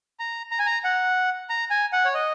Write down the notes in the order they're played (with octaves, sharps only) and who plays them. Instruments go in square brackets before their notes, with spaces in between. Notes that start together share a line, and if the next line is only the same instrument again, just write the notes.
[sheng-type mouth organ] A#5
A#5
G#5
A#5
F#5
A#5
G#5
F#5
C#5
D#5